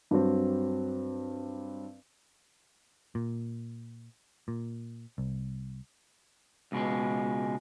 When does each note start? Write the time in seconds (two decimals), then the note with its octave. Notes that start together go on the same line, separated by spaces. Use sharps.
0.11 G2 F#3 C4
3.15 A#2
4.48 A#2
5.18 C2
6.72 C#2 B2 G#3